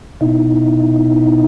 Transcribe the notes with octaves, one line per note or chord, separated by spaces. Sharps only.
B2 D#4 E4